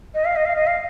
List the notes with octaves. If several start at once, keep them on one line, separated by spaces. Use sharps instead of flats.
D#5
F5
D#5
F5
D#5
F5